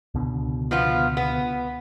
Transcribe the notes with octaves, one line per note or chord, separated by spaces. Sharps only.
C#2 B2 D3
F3 B3 F4
B3